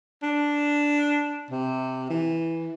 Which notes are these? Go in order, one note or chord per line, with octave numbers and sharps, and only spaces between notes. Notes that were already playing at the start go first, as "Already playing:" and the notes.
D4
C3
E3